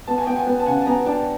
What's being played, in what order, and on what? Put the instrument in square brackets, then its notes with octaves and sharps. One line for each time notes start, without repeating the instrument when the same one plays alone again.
[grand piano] B3 [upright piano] A5
[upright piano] G#5
[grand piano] B3 [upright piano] G5
[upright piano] F#5 G#5
[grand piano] B3
[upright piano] A5
[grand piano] C#3 [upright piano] F#5 G#5
[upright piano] A5
[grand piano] B3 [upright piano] G#5 A#5
[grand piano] D4 [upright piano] G5 A5